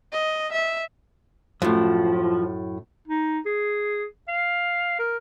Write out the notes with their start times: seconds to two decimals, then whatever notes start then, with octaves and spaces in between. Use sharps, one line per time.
0.13 D#5
0.52 E5
1.62 F#2 A2 F3
3.08 D#4
3.46 G#4
4.28 F5
4.99 A#4